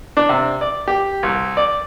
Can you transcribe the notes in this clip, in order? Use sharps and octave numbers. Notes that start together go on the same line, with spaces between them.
D4
C3
D5
G4
C2
D5